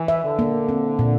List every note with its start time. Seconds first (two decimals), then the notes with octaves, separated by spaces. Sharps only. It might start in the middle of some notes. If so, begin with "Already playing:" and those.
Already playing: E3
0.08 E5
0.24 D3
0.39 A#3
0.69 C4
0.99 A#2